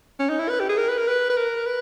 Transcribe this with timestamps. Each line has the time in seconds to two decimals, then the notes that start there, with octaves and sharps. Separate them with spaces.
0.20 C#4
0.29 D#4
0.39 E4
0.49 B4
0.60 G4
0.69 G#4
0.78 A#4
0.88 B4
0.98 A#4
1.08 B4
1.30 B4
1.37 A#4
1.66 B4